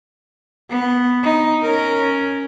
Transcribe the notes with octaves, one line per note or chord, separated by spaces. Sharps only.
B3
D#4
C#4 A#4